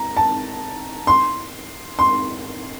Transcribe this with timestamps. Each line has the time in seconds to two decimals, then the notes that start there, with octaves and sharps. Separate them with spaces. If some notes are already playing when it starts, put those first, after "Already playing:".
Already playing: A#5
0.17 A5
1.07 C6
1.99 C6